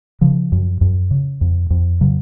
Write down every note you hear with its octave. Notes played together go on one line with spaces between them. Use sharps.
C#3 F3
F#2
F#2
C#3
F2
F2
C#3 F#3